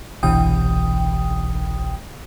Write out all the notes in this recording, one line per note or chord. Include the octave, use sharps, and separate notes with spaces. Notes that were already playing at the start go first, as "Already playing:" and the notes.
G1 C2 B2 E3 G5 D#6